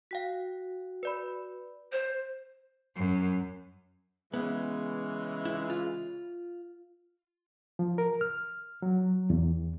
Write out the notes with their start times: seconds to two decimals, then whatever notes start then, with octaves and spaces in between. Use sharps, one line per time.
0.11 F#4 F5 G5 B6
1.03 B4 D5 B5
1.92 C5
2.96 F#2
4.34 C#3 E3 G#3 B3
5.45 E4
5.70 F4
7.79 F3
7.98 A#4
8.21 F6
8.82 F#3
9.30 E2